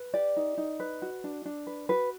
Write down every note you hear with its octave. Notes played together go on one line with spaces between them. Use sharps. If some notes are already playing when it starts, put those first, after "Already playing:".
Already playing: B4
G4 D5
D#4
D#4
B4
F#4
D4
D4
B4
F#4 B4